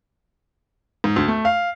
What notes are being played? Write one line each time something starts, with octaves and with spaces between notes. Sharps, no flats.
G#2
D2
A3
F5